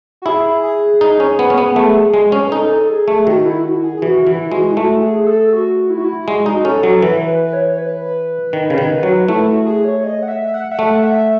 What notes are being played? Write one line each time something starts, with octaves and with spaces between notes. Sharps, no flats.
F#4
E4 G#4
G#4
D#4
C#4
B3
C#4
B3
A3
G#3
C#4
B4
D#4 A4
G#4
A3
D#3 F#4
E4
F#4
G#4
G#4
E3 F#4
E3 E4
G#3 F#4
E4
A3 F#4
G#4
A4
F#4
E4
F#4
E4
G#3 F#4
D#4
C#4 A4
F#3
E3 B4
B4
C#5
B4
D#3
C#3
D#3
F#3
A3 E4
F#4
G#4
C#5
D#5
F#5
E5
F#5
E5
A3 F#5
E5